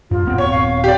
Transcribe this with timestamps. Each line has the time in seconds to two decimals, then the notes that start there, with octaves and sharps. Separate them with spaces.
0.11 G2 F4
0.25 D#1 B3 C4
0.38 C#5 C#6
0.52 F5
0.84 G4 D5